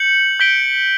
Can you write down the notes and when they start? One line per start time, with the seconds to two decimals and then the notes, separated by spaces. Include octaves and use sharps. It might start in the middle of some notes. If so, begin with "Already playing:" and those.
Already playing: G6 C#7 F#7
0.40 G6 B6 D7 G7